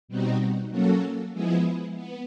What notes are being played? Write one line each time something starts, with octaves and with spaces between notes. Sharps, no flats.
B2 G3 C4 D#4 F#4
F#3 A#3 C#4 F#4 A4
F3 G#3 B3 E4 G#4
B3